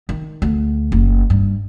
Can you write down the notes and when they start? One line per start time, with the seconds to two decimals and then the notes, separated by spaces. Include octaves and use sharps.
0.09 D#3
0.42 D2
0.92 F#1
1.30 G2